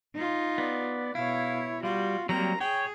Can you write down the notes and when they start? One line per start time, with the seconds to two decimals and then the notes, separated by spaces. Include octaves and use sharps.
0.15 D#4 F4
0.58 B3 D5
1.15 B2 E4 C#5 F5
1.83 G3 F4 F#4
2.29 F#3 G3 A#3 C4 A#5
2.60 G#4 C#5 G5